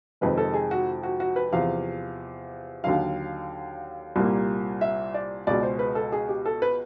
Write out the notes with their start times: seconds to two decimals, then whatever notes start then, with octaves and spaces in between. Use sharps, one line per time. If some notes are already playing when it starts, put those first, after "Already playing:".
0.21 F2 C3 D#3 G#3 B4
0.38 A4
0.54 G#4
0.71 F#4
1.03 F#4
1.20 F#4
1.36 B4
1.52 E2 C3 F3 F5
2.84 D#2 D3 F#3 F5
4.16 C2 A#2 G3 A#3
4.81 E5
5.14 D5
5.47 C#2 B2 G#3 D5
5.63 C5
5.79 B4
5.95 A4
6.12 G#4
6.29 G4
6.46 A4
6.62 B4